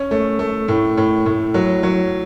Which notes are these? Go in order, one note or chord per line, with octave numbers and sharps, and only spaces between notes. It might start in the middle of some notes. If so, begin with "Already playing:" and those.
Already playing: C#4
A3
A3
A2
A2
A2
F#3
F#3